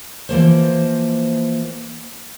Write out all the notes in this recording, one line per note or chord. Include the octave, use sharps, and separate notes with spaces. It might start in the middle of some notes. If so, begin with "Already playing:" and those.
E3 F3 A#3 C5